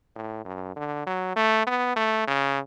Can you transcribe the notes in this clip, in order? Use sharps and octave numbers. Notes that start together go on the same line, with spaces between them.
A2
F#2
D3
F#3
A3
B3
A3
C#3